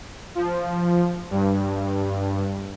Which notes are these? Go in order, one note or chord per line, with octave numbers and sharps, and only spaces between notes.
F3
G2